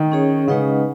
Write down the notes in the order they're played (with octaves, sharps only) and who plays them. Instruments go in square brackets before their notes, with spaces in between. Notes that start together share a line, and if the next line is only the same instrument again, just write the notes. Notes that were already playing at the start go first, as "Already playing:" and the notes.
Already playing: [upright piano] D#3
[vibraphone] C#4 G#4 C#5
[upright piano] C#3 [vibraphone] G#3 D#4 B4 D#5 F#5